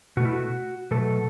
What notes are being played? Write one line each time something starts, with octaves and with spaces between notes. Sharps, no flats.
B2 A3 F#4
E4
F#4
B2 F#3 A3 A4